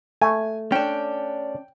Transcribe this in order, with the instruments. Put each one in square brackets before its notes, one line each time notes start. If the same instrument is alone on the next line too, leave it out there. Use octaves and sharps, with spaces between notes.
[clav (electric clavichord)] A3 [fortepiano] G#5
[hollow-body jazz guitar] C#4 D4 [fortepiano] G5